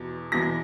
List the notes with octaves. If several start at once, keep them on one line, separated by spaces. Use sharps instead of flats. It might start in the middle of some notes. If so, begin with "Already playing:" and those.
Already playing: E2 B2
E2 B2 A#6